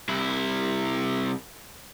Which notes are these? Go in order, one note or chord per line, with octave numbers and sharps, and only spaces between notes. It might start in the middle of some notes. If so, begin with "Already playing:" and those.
C2 E4